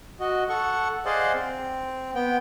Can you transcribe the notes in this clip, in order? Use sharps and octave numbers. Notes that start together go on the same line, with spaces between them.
F#4 D#5
A4 F#5 C#6
G#4 C5 D5 D#5 F5 F#5
C4
B3 G5